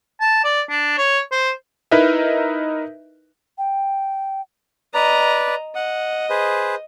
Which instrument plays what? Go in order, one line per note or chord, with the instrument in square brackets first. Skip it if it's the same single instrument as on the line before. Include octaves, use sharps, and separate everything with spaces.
[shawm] A5
D5
D4
C#5
C5
[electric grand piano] D#4 E4 A#4 B4 D#5 E5
[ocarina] G5
[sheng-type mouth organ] B4 D5 [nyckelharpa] D#5 A#5
[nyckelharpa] D#5 [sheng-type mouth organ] F#5
[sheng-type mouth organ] G#4 B4 C5